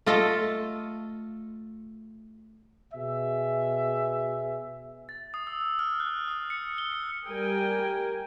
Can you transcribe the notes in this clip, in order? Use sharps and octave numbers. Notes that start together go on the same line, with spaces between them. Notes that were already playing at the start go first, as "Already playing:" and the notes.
A3 F4 A4 D#5
B2 G#4 E5
A6
D#6
E6
E6
F6
F#6
D#6
C#7
G7
C#7
G3 A#4 G5 G#5